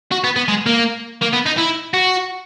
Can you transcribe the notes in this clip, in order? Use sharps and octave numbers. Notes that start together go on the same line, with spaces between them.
F#4
B3
B3
G#3
A#3
A#3
B3
D#4
E4
F#4